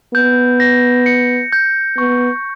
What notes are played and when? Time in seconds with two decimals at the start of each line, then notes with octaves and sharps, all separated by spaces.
0.14 B3 G6
0.60 A#6
1.06 C#7
1.53 G6
1.97 B3 C#6